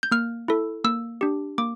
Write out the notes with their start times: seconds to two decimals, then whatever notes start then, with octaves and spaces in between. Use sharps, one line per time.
0.03 G6
0.11 A#3 F6
0.48 E4 A4
0.84 A#3 E6
1.21 D4 G4
1.58 A#3 D6